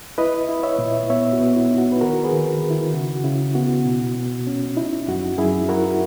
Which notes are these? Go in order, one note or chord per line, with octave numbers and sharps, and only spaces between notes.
E4 B4 D#5
E4
C#5 E5
A#2
B3 C#5 E5
F#4
B3
E4
D#4
F#4
B4
D#3 F#4 A#4
G#4 B4
D#3
D#3
E4
C#3 F#4
C#3 E4
B3 F#4
B2
B2
C#4
D#4 E4
F#2 F#4
F#2 E4 G#4
E4 F#4 A#4